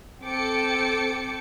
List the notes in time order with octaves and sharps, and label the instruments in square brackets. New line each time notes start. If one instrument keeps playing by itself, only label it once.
[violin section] C4 A4 G5 D6 C#7